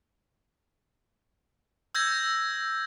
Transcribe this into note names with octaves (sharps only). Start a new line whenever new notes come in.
E6 G6 G#6 A#6